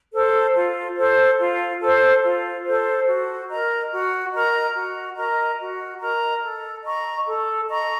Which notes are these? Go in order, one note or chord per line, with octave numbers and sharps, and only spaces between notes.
A4 C5
F4
A4 C5
F4
A4 C5
F4
A4 C5
F#4
A#4 D#5 A#5
F#4
A#4 D#5 A#5
F#4
A#4 D#5 A#5
F#4
A#4 D#5 A#5
A4
D#5 A#5 C#6
A4
D#5 A#5 C#6